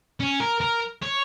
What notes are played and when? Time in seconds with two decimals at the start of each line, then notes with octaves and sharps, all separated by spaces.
0.20 C#4
0.40 A#4
0.61 A#4
1.02 C#5